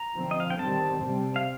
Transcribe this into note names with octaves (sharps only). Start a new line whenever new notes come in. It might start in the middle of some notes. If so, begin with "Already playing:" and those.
Already playing: A#5
D3 F3 C4
D#5
F5
G5
D#3 G3 C4 A5
C3 G3 C4
F5